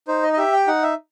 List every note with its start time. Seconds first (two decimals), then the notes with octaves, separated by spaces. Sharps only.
0.08 D#4 C5
0.23 D#5
0.33 D#5
0.37 G4 E5
0.53 G5
0.67 D#4 F#5
0.83 E5